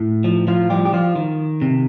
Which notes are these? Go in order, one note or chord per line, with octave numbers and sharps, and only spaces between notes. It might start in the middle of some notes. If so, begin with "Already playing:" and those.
Already playing: A2
F3
F3 F4
F3 G3 G4
G4
F3 F4
D#3
C3